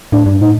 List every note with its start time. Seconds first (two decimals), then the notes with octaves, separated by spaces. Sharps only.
0.12 A2 D4
0.26 G2 D4
0.41 A2 D#4